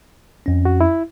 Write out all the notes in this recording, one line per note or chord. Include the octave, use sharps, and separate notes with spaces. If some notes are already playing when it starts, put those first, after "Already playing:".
F2 C#4
F#4
E4